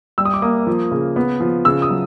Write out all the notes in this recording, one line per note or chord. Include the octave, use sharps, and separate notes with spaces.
G3 E6
D#6
D6
A#3 D#6
F3
C#3
B3
F3
C#3 E6
D#6
F#3